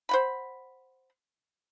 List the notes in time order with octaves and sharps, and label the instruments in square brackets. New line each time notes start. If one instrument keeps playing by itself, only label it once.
[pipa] C5 F#5 B5